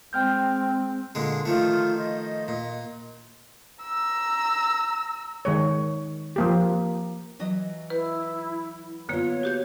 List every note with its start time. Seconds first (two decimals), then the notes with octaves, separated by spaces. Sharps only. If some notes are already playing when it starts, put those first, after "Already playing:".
0.13 G#3 C4 G5 F6 G6
1.15 A#2 D3 G#3
1.46 D#3 F3 A3 F4
1.98 D#5
2.48 A#2
3.83 A#5 E6
5.45 D#3 G#3 C#5
6.36 F3 A#3 G4
7.39 E3 F#3 D#5
7.90 E4 B4
9.09 D3 A#3 B3 F4 C#5
9.43 F#4 G4 G6